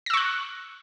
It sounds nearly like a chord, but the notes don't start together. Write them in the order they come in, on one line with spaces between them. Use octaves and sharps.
A#6 E6 C#6 F#6